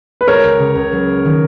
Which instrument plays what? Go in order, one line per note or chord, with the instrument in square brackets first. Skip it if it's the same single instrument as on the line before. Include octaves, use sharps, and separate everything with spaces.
[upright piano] B4
[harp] G#3 [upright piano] A#4 C#5
[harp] C#2
C#3
C#2
F#3
A#3
D#3